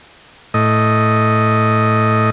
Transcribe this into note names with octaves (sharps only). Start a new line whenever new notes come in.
A2 D#5